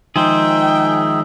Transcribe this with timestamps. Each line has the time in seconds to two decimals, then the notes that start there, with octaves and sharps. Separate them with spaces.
0.16 D#3 F3 G#3 D#4 G#4 C5 E5 G5